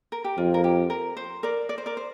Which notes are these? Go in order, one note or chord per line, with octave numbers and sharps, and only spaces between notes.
A#4
G4
F2 F4
A#4
G4
A#4
C5
A#4 D5
D5
C5
A#4 D5
C5